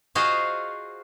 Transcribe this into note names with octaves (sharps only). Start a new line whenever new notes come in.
F4 F#4 G#4 C5 D#5 F5